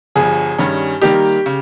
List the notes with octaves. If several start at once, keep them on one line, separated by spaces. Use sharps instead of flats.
G1 G2 F3 G#4
G2 D#3 G3 C#4
D#3 G3 A#3 D#4 G4
C#3